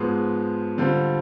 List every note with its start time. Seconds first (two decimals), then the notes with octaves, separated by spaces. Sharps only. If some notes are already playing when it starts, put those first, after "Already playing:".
Already playing: G#2 F3 G#3 B3
0.78 D3 G3 C4 F4